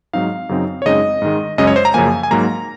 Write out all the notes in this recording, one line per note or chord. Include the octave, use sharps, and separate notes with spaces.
G#2 F#3 C4 D#4 F5
F#2 C#3 F#3 C4 D#4
C#5
F#2 C#3 G#3 C4 D#4 D#5
G#2 D#3 G#3
F#2 C#3 G#3 C#4 D#5
C#5
C5
A#5
F#2 C#3 F3 A#3 G#5
G#5
G#2 F#3 A#3 A#5